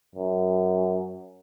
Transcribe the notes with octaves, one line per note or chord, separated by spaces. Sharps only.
F#2